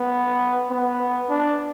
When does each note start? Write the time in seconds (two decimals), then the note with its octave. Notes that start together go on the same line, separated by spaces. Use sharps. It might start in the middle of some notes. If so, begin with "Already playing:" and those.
Already playing: B3
0.70 B3
1.29 D4